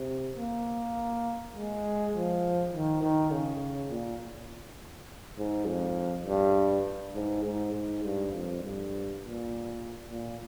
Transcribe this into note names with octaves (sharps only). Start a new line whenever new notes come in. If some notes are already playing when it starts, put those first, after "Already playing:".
Already playing: C3
A#3
G#3
F3
D#3
D#3
C#3
A#2
G#2
F2
G2
G#2
G#2
G#2
G2
F2
G2
A#2
A#2